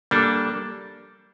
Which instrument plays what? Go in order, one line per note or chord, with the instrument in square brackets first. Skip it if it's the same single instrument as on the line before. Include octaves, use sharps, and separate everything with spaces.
[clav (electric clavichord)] G3 A#3 D4 A4